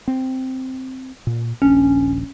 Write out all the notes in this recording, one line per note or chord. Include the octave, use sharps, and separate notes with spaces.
C4
A#2
D#1 A#1 C#4 D4